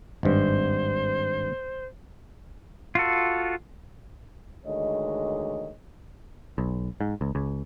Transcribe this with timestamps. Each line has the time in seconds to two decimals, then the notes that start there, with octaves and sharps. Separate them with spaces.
0.23 G#1 G2 C5
2.95 F4 F#4 A4
4.66 D2 D#3 G#3 C#5 D#5
6.58 B1
7.01 G#2
7.21 C#2
7.35 C#2